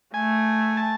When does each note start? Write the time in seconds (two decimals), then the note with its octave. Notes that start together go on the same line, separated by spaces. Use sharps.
0.14 A3 G#5
0.77 A5